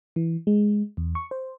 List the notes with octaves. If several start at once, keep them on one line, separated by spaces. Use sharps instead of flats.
E3
G#3
E2
C#6
C5